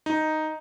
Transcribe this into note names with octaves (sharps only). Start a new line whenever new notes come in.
D#4